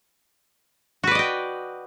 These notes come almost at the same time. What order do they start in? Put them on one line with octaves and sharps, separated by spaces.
F#4 B4 D5 D#5 G5